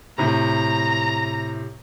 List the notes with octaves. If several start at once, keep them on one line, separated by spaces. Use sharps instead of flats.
A2 C3 A#5